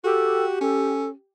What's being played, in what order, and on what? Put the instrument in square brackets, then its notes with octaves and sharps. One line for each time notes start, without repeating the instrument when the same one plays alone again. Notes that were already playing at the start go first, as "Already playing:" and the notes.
[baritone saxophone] F#4 [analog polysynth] G4 [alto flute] A4
[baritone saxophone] C#4 [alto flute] A4